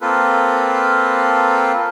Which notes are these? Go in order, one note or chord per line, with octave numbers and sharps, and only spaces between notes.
A#3 C4 F4 A4 B4